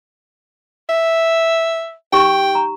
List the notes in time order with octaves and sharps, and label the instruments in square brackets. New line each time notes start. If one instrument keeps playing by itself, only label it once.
[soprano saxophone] E5
[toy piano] D#4 G4 C#6 [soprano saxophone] G5
[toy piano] A#5